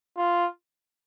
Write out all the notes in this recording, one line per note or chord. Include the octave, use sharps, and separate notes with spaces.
F4